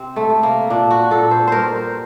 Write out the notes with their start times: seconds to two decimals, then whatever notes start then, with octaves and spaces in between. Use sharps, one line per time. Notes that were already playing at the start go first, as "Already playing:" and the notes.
Already playing: C3 C4
0.16 A3
0.30 C3
0.43 A#3
0.70 A#2 D4
0.91 F#4
1.11 A#2 A4
1.31 C5
1.48 G2 A#4 C5